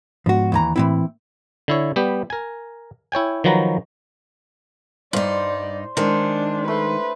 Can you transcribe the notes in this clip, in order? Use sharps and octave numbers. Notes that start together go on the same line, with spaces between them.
G#2 F3 B3 D4 F#4
D#2 E3 A#5
A2 E3 A#3 C4 E4
D3 E4 C#5
G3 B3 G4
A#4 G#5
E4 C#5 G5 G#5
D#3 F3 F#3 F#4 B4 A#5
G2 D#4 C5 D5
D#3 G#3 D4 C5
A3 B4 C6